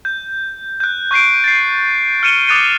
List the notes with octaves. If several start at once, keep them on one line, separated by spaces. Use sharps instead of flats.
G6
F#6 G6
C#6 G6 C7 D7
A6 C7
F6 C#7 D#7 E7 G7
D6 D#6 F#6 A6 D#7